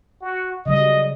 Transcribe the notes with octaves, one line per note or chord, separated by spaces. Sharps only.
F#4
C#3 F#3 G3 D#5